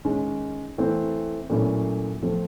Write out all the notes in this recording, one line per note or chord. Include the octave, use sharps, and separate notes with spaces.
D#3 G#3 C#4
E3 A3 C4
A#2 F#3 A3 C#4 E4
F3 A3 C4